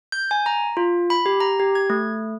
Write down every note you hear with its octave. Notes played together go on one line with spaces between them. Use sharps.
G6
G#5
A#5
F4
B5
G4
A#5
G4
G#6
A3